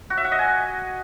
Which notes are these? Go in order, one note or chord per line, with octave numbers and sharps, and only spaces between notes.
F#4
E5
F#5
D#5
G#5